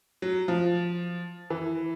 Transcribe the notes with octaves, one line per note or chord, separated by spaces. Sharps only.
F#3
F3
E3